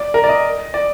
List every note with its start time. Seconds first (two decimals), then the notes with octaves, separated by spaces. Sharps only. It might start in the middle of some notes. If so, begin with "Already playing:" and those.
Already playing: D5
0.14 A#4
0.24 D5
0.29 D#5
0.74 D5